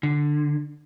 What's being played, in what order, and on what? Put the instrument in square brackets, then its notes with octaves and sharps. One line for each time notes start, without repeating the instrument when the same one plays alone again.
[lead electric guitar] D3